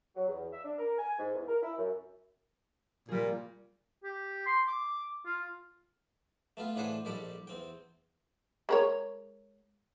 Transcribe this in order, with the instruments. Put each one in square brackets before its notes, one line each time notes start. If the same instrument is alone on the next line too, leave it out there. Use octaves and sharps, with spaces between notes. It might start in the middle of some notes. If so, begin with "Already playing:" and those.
[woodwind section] F#3
E2
E5
D4
A#4
G#5
G#2
E2
A#4
E4
F#2
[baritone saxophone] A#2 [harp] G3 G#4
[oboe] G4
C6
D6
F4
[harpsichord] A3 B3 F4
A2 E3 D4 G#4 C5 F#5
A#1 G#2 G3 G4 A4 D6
E2 C4 G5
[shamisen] G#3 A#4 C#5